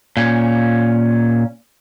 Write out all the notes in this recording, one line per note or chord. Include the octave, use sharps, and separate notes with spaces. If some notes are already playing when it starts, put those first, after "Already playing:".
A#2 C#4